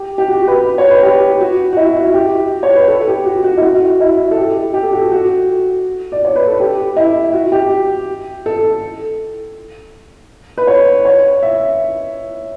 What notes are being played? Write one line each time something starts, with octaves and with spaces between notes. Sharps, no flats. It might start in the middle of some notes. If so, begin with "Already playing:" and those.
Already playing: G4
G4
F#4
B4
C#5
B4
G4
F#4
F#4
E4
F#4
G4
C#5
B4
A4
G4
F#4
F#4
E4
F#4
E4
A4
G4
G4
A4
F#4
A4
F#4
D5
C#5
B4
A4
G4
E4
F#4
G4
A4
B4
C#5
C#5
E5